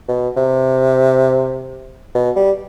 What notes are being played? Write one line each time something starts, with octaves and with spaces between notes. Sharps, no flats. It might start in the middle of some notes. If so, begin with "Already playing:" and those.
B2
C3
B2
G3